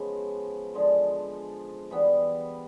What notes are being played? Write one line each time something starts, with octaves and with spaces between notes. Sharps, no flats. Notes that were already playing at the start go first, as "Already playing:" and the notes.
Already playing: C#3 F3 G#3 B3
D3 F3 G#3
E3 G3 B3